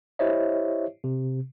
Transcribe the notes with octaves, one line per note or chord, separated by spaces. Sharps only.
E4 G4 C5 C#5 D#5 E5
C3